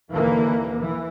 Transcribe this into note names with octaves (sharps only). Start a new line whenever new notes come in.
D#2 D3 E3 A#3
E3